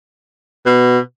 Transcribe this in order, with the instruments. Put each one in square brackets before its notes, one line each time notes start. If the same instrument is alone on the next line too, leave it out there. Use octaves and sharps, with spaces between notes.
[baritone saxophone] B2